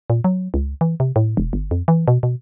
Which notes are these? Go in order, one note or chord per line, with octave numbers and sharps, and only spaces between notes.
A#2
F#3
C#2
E3
C3
A2
E1
G1
F2
E3
B2
B2